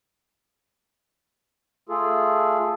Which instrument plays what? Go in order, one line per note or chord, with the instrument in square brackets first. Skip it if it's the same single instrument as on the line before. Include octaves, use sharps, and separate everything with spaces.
[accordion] A3 F4 G#4 A4